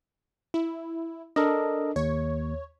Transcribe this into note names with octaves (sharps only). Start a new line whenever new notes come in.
E4
D4 A4 A#4 D#5
D#2 C#5